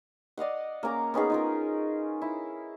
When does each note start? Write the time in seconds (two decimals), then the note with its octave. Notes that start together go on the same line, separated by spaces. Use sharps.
0.37 D5 D#5 F5 F#5
0.83 A#3 C#4 A#5 D6
1.14 B3 C#4 D#4 G#4
1.30 D#4 F4 A#4
2.22 E4